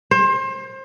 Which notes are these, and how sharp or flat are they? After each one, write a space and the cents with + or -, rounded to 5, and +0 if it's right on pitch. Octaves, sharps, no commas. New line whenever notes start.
C5 +30